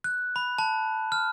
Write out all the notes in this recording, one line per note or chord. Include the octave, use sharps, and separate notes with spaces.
F#6
B5
A5
F6